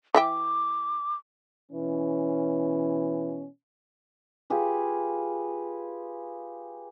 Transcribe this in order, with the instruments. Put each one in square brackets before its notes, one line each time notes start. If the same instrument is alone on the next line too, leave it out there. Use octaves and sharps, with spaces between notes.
[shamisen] E3 E5 G5 [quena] D6
[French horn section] B2 C#4 [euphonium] E3
[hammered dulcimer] F4 G4 G#4 B4